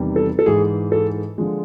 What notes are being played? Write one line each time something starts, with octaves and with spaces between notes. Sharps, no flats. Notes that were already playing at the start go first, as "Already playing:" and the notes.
Already playing: E2 C3 D#3 G3
A4
A4
G#2 E3 G#3 G#4
A4
D3 F3 G#3